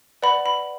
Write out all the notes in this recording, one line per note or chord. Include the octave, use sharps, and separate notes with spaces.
B4 D5 F#5 B5
B5